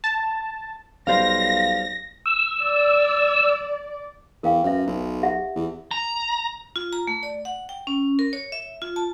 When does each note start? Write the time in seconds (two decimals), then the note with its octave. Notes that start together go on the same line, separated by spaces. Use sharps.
0.04 A5
1.07 B1 G3 C5 F5 A#6
2.26 E6
2.59 D5
4.43 E2 A#4 F5 G5
4.64 F#2 B4 E5
4.87 B1
5.23 G4 E5 F#5
5.56 E2
5.91 A#5
6.76 F4
6.93 A#5
7.07 A3
7.23 D5
7.45 F#5
7.69 G5
7.87 C#4
8.19 A#4
8.33 C#5
8.52 E5
8.82 F4
8.96 A5